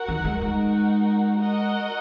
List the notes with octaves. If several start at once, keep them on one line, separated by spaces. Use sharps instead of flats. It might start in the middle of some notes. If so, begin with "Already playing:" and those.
Already playing: F#4 A#4 F#5
D#3
G#3
G#3 D#4 F#4 A#4 F#5
F#4 A#4 D#5 F#5